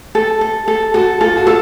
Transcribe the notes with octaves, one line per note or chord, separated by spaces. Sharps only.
A4
A4
A4
F#4 A4
F4 A4
F#4
F4 A4